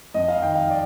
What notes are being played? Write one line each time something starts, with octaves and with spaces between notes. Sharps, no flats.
F2 D#5
F5
D#3 G5
F5
D5